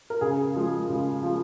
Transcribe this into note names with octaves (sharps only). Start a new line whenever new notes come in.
A#4
C#3 G#4
F3 G#3
C#3
F3 G#3